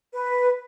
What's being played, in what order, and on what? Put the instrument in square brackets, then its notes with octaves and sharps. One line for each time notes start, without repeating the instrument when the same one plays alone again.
[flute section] B4